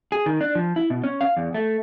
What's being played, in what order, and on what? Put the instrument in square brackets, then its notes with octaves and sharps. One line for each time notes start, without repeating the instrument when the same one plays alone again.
[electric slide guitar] G#4
D#3
D4
F3
E4
B2
C#4
F5
E2
A3